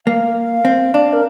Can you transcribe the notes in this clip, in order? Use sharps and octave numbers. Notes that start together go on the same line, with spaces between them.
A#3 F5
C4
D4
A#4